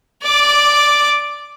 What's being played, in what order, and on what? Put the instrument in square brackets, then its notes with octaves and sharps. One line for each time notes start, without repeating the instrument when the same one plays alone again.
[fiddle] D5 D6